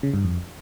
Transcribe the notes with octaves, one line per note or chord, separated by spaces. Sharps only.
C#3
G2
F2